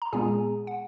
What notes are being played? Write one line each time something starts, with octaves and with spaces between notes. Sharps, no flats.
A#5
A#2 G#3 B3 G#4 G#5
F#5